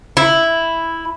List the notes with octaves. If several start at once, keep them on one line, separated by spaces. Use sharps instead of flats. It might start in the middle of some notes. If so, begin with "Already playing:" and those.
E4